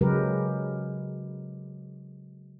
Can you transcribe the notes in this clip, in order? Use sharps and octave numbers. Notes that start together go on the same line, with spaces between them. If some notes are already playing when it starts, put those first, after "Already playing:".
C#3 F#3 G#3 G4 A#4 B4